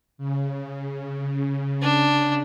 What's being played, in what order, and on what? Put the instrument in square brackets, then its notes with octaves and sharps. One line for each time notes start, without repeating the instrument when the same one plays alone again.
[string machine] C#3
[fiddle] D4